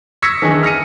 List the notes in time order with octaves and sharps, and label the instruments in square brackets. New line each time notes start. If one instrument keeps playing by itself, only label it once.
[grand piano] C#6 E6 G#6 A#6 B6 C#7
D#3 E3 D4 G#4
F6 A#6 C#7 D#7